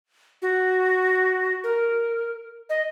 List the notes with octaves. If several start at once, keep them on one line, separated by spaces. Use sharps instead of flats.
F#4
A#4
D#5